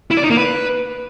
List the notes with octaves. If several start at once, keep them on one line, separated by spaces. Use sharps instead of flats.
E4
D5
D#4
A#3
B4